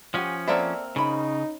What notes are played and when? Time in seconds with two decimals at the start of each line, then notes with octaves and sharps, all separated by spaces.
0.14 F3 C#4 G4 F#5 G#5
0.48 A#3 C4 A4 D5 E5 F#5
0.96 C#3 C#4 D#4 B5